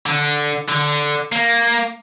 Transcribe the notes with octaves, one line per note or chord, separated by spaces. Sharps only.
D3
D3
A#3